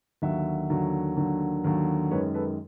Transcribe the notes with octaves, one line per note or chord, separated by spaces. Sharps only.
D#2 D3 F#3 E5 F#5
D#2 D3 F#3
D#2 D3 F#3
D#2 D3 F#3
F#2 D#3 G#3 B4 C#5
A4 B4